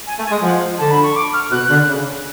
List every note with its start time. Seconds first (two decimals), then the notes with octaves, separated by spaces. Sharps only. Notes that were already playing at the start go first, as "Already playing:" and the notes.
0.07 G#5
0.18 A3
0.25 G#5
0.30 G#3
0.42 F3 F#5
0.78 D3 A5
0.91 B5
1.02 C#6
1.15 D6
1.33 F6
1.51 B2 F#6
1.70 D3
1.88 C#3